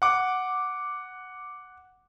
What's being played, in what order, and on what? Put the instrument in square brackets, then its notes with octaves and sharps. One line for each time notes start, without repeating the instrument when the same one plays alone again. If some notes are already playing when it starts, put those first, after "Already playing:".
[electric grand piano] F#5 D6